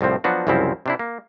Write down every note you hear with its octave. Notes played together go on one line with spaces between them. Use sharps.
C2 A2 F3 C4
F3 F#3 B3 D4 F#4
C2 F#2 C#3 F3 C4 E4
C3 D4 E4
A#3